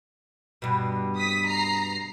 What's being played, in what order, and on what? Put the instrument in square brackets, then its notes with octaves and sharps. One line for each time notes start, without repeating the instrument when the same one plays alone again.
[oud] G2 B2
[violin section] D#6 B6
A#5 C7